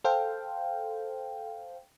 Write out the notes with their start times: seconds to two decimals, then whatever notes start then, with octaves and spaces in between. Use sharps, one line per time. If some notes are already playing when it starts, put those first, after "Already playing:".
0.04 A4 C5 F5 G5